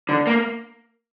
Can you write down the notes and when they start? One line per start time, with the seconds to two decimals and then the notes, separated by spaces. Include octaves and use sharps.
0.09 D3
0.27 A#3